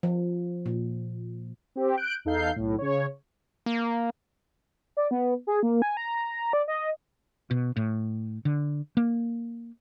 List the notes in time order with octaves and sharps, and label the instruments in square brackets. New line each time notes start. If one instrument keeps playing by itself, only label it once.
[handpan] F3
A#2
[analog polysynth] C4 G4
F#6 G6 D7
E2 D#4 A4 F5 G6 C7
B1 A2
C#3 C#5
[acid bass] A#3
[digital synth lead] D5
B3
G#4
A#3
G#5
A#5
D5
D#5
[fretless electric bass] B2
A2
D3
A#3